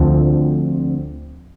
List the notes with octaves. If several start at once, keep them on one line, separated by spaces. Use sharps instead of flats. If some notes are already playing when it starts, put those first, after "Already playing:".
Already playing: D2 D3 F3 C4